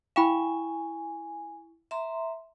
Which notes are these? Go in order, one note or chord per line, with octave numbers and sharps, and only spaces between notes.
E4 F5 G5 G#5 B5 C#6 E7
E5 A#5 C6